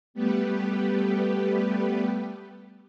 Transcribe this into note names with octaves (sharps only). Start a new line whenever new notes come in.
G3 A3 B3 G4 B4